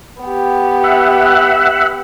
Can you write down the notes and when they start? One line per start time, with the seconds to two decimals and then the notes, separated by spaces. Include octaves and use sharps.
0.22 B3 G4
0.84 E5 F#5